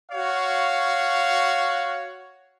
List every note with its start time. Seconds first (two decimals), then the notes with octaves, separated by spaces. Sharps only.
0.11 F#4 C#5 F5